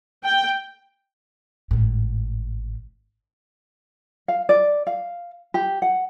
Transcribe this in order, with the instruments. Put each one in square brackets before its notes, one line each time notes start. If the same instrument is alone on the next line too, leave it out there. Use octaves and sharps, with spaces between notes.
[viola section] G5
[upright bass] G#1 A2
[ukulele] F5
D5
F5
G4
F#5